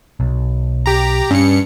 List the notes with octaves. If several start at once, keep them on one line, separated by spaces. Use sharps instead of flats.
B1
G4 A#5
G2 C#4 C#7